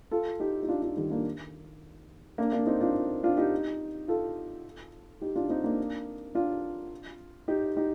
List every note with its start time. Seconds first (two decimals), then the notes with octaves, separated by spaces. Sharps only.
0.11 F4 A4
0.40 D#4 G4
0.63 D#4
0.68 D4 F4
0.82 D4 F4
0.96 D#3 G3
1.10 A#3 D4
2.38 A#3 D4
2.52 A#3 D4
2.67 C4 D#4
2.80 D4 F4
3.23 D4 F4
3.37 D#4 G4
4.08 F4 A4
5.22 D#4 G4
5.36 D4 F4
5.49 C4 D#4
5.64 A#3 D4
6.35 D4 F4
7.48 D#4 G4
7.76 D#4 G4